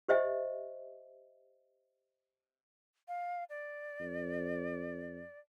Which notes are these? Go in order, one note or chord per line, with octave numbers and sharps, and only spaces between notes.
G4 C5 D#5 E5
F5
D5
F2